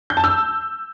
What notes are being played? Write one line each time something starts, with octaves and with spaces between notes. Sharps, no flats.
G6
A5
E6